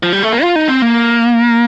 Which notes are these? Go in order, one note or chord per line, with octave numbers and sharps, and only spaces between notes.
F3
G3
A3
A#3
F4
D#4
C4
A#3